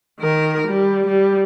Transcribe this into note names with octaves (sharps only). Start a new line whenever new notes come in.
D#3 A#4
G3
G3